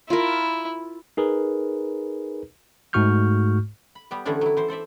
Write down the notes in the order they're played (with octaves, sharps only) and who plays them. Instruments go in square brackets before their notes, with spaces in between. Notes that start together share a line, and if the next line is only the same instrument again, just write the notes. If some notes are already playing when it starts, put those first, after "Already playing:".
[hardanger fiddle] E4 [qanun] F4 A#4
[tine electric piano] D#4 G#4 A#4 B4
G#2 A3 F#4 C#6 F6 G6
[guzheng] B5
G3 B3 G4
D3 E3 A3 B3 C#4 D4
F#3 E4
E3 C5
A4 C5 D5 E5